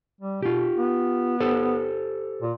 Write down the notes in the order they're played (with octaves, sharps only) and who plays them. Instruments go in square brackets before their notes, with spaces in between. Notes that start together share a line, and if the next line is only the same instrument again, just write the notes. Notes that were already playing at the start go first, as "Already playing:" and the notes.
[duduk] G3
[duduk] B2 [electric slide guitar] F4 G4
[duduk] B3
[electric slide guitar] G4 A4 C5
[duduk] A#2